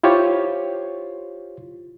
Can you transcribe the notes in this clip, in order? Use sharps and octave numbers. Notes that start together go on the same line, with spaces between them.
E4 F4 G4 C5 C#5